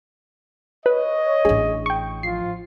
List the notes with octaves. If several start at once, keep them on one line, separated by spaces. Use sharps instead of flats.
B4 C#5 D#5
A1 D4 G#4
G5 C#6
F3 F4 C7